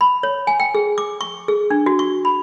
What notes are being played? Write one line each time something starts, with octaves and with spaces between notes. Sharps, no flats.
B5
C#5
G#5
G5
G#4
D6
C#6
G#4
D4
F#4
C#6
B5